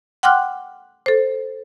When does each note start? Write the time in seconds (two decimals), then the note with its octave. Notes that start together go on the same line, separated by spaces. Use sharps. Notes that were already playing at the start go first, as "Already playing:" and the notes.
0.23 F#5 G5 C6 D6 F6 F#6
1.06 A4 C5